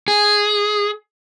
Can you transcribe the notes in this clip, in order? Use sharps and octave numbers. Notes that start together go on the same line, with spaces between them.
G#4